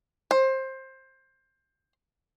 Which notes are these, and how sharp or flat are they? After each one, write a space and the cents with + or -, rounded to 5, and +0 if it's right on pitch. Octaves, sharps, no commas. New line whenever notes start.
C5 +20